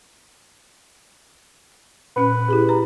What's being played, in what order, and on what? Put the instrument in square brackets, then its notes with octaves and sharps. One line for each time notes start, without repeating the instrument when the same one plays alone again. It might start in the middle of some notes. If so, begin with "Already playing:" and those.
[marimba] A#2 C#4 F#6 [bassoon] B4
[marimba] E4 G4 G#4
B4 A#5